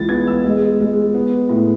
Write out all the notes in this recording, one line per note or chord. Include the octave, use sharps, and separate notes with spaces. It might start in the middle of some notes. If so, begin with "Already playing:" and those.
Already playing: C#2 E3 A6
B3 G#6
E6
G#3
G#3
B3
A2